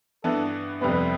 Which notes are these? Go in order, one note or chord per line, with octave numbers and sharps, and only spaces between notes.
G2 E3 B3 A4
F2 C3 G3 B3 B4